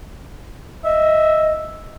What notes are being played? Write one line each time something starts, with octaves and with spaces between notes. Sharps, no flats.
D#5 E5